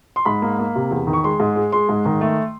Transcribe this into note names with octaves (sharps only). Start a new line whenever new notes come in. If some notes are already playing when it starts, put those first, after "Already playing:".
C6
G#2 B5
A#3
A#3
C3
E2
D#3
C#6
G#3 C6
G#2
G#3
G#3 C6
G#2
D#3
A3